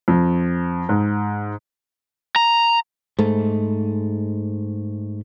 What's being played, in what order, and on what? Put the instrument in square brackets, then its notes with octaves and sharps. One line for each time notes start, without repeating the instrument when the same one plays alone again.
[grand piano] F2
G#2
[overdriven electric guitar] A#5
[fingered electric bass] G#2 A3